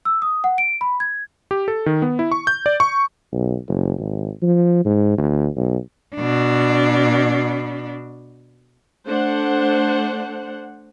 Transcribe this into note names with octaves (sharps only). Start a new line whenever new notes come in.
E6
D#6
F#5
D7
B5
G#6
G4
A4
D#3
B3
E4
C#6
G6
D5
C#6
B1
F#1
G#1
F3
G#2
D2
B1
B2 D4
A3 D4 C5 F#5